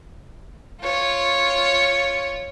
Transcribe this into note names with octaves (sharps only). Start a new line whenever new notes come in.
F4 C#5